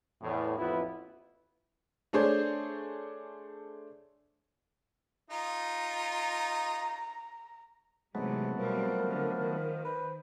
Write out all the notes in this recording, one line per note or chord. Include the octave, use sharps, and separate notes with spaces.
E2 A2
A1 F2 B3 E4 F4
A3 D4 G#4 C5 C#5
D#4 F4 A#5
G#2 C3 E3 F#3 G#3 A3 B3
B2 F3 G3 C4 A#4
D3
D#3
B4 C5